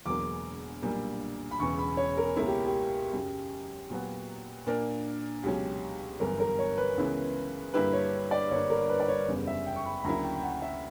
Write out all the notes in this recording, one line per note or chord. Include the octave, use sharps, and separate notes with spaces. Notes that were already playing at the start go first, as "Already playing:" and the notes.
E1 E2 D3 F#3 A#3 D6
B1 A#2 G3 A#3 D4
B5
E1 E2 C#3 E3 C#6
B5
C#5
A#4
C#2 B2 A#3 E4 A#4
G4
G4
F#2 C#3 F#3
A#2 F#3 B3 F#4
A#2 A#3 D4 A#4
C#2 B2 F#3 C#4 G4
G1 F#2 E3 G3 B3 A#4
A#4
C#5
B4
C#2 C#3 E3 B3 E4
G2 D3 A#3 E4 G4 B4
C#5
D5
G1 G2 D3 A#3 C#5
A#4
B4
D5
C#5
F#1 E2 C#3 G3 B3
E5
G5
C#6
B5
B5
D2 C#3 F#3 A#3 E4 A#5
G5
G5
F#5
E5